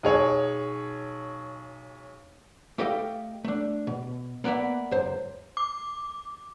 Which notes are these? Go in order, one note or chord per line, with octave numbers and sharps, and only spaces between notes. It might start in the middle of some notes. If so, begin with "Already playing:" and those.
B1 G#4 C#5
A3 G4 A4 D#5 F5 G5
A3 D4
B2
A#3 B3 D5 E5 F#5
C#2 F#2 C5
D6